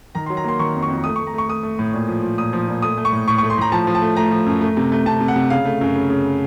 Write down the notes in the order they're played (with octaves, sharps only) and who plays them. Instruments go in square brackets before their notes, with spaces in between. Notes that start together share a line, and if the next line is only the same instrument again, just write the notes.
[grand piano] D#3 A#5
C6
F#3
A#5
A#3 C6
D#3 C#6
F2
C#6
F2
A3 D#6
C#6
A3
A#5
A3 C#6
A3 D#6
A3
A2
A#2
F3
F3
A#2 D#6
F3
A#2
A3 D#6
A3
C#6
A2
A2 C#6
C#6
A3
C6
A2 A#5
F3 A5
F3
A5
A3
A3 A#5
F3
F#2
A3
C3
A3
C3 A5
C3
F#5
C3
C#3 F5
A3
F#2
C#3
C#3